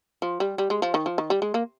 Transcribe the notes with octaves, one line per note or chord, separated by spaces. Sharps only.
F3
G3
G3
G#3
F3
D#3
F3
D#3
G3
G#3
A#3